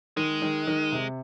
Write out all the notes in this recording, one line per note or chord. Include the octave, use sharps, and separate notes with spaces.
D#3 G#3
D#3
D#3
C3